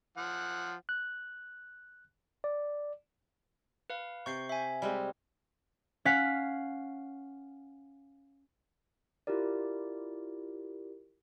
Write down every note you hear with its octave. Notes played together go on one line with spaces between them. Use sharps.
F3 F#5
F#6
D5
B4 F5
C3 C#6 G6 C7
E5 G#5
G3 G#3 C4
C#4 F5 F#5 B6
E4 F4 G4 A#4 D5